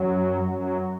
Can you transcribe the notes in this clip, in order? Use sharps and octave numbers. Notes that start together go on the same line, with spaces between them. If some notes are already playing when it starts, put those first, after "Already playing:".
Already playing: F#2 F#3
F#2 F#3